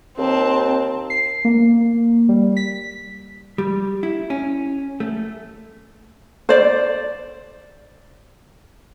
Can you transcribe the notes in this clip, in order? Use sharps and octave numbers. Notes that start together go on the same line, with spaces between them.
D#2 C4 A5
C7
A#3
G3
B6
G3
E4
C#4
A3
C5 D5